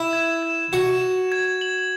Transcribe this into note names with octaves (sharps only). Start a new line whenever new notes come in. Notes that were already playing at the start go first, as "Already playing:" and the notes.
Already playing: E4 E7
G#6
G#6
F#4 E7
E7
G#6
F#7